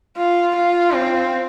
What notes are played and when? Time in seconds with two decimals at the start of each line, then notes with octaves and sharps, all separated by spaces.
0.17 F4
0.56 F4
0.95 C4